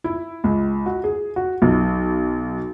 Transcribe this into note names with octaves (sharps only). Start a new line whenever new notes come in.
E4
C#2
F#4
G#4
F#4
B1